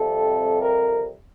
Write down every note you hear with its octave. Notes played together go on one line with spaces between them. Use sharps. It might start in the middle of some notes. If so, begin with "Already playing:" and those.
Already playing: F2 C3 G3 A4
A#4